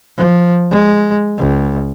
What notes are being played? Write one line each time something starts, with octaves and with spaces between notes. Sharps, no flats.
F3
G#3
C#2